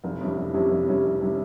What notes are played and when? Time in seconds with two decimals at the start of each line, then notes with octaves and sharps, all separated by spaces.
0.04 F1
0.21 F2 C3 G3 C#4
0.36 F1
0.54 F2 C3 G3 C#4
0.71 F1
0.88 F2 C3 G3 C#4
1.05 F1
1.21 C3 G3 C#4